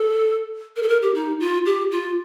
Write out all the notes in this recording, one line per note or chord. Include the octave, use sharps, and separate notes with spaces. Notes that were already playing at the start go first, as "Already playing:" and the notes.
Already playing: A4
A#4
A4
A#4
G4
D#4
F4
G4
F4